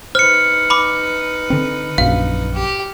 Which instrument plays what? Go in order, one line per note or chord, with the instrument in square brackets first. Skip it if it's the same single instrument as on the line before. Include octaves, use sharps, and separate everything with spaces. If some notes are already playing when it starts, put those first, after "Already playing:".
[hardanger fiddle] D#4 B4 [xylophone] C5 [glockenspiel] F6 C#7
[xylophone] B5 D6
[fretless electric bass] D3 C4
[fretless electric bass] A#1 F#2 [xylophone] F5
[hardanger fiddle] G4